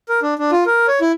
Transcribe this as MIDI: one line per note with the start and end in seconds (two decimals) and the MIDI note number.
0.09 0.20 70
0.22 0.34 62
0.39 0.51 62
0.52 0.64 65
0.66 0.86 70
0.88 0.99 73
1.01 1.12 64